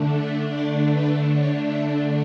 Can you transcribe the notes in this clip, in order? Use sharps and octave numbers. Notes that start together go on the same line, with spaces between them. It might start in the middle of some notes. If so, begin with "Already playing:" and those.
Already playing: D3 A3 D4
E5
D5
B4
C#5
E5